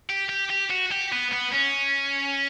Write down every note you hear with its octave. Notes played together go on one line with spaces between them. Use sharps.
G4
G4
G4
F#4
G4
B3
B3
C#4